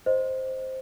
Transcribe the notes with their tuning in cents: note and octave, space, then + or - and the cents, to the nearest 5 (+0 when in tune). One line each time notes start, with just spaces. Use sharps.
C5 +0 D#5 +0